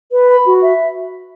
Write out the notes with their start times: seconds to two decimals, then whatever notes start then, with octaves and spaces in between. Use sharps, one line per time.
0.11 B4
0.28 B5
0.45 F#4
0.62 E5